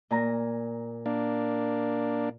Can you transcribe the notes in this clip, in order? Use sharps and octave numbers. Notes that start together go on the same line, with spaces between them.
A#2 G#5 A#5
A#3 D4